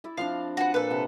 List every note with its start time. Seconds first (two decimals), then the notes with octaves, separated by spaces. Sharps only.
0.04 E4 D5 E5
0.17 F3 C4 D4 F5
0.57 D4 F#4 B4 F#5
0.74 A#2 A4 B4
0.90 C3 F#5